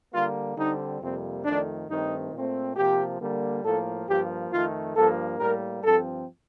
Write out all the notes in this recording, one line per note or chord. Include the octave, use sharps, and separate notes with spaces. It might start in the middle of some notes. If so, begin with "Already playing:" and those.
D3 G3 A#3 F4
D3 G3 C4 D#4
F2 C3 G3 A#3 C4
F2 D#3 A3 D4
G2 D#3 A3 C4 D#4
A#2 A3 C4
C3 F3 A#3 G4
D3 G3 A#3
A2 F3 A#3 A4
G2 F3 A#3 G4
F2 D#3 A3 F4
G2 F3 A#3 A4
A2 G3 A#3 A#4
G2 F3 C4 A4